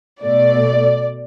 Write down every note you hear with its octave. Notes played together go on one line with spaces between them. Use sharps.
B2 A3 D5